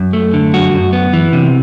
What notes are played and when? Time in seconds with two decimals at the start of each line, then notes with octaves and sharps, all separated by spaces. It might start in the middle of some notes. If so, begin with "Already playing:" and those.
Already playing: F#2
0.13 A3
0.33 D3
0.54 F#2 F#4
0.73 F#2
0.93 B3
1.13 E3
1.33 C3